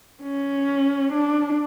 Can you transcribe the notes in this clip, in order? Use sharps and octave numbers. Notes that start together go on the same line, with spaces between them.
C#4
D4